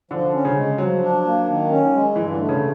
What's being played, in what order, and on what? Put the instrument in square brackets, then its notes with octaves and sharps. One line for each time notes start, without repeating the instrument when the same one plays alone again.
[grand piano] D3 [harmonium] F3
[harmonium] C#4
[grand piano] C#3
[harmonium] G#3
[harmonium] F3 [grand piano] F#3
[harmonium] D4
A#3
D#3
C#4
G#3
[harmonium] G2 [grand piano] E3
[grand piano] D3
[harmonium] A3
[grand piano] C#3